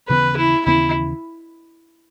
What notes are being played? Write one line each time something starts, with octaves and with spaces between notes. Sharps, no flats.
D#2 C#3 E3 B3 B4
E4
D#2 C#3 E3 B3 E4